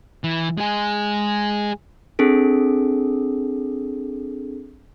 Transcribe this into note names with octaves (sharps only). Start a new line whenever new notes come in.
E3
G#3 G#4
C4 D4 G#4 A4